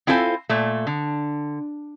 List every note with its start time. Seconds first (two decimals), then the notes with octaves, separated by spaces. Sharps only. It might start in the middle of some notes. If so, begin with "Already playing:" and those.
0.07 C4 E4 F4 A4 C5 G#5
0.49 A#2 A3
0.87 D3